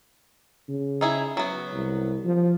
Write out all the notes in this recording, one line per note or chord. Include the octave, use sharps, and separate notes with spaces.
C#3
D#4 E4 G#4
F#3 B3
C2
F3